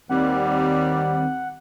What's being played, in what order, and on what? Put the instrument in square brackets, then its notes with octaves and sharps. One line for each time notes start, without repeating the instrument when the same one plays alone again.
[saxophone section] D#2 G3 [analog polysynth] D#3 C4 [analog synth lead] F#5